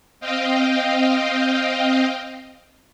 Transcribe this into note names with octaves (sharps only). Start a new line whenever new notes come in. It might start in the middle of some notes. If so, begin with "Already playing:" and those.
C4 D#5 F5 G5